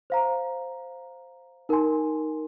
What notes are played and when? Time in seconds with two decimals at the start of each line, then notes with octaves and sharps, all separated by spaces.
0.10 C5 F5 A#5
1.69 D#4 A#4 G#5 C6